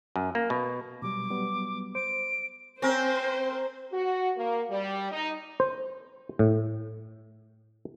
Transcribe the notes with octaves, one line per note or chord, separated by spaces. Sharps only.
F#2
A#3
B2
B2 F#3 G3 D6
F#3 G3 B3
C5 D7
C4 C#4 A#4 C5
F#4
A#3
G3
D#4
C5
A2